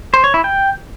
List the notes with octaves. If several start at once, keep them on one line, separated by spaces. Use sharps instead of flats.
C5
C#5
E4
G5